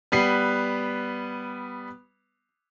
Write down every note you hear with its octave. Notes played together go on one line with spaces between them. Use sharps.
G3 B3 B4 C7